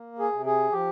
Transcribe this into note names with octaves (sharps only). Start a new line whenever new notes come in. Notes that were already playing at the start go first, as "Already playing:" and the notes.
Already playing: A#3
G#4
C3
G#4
F3 G4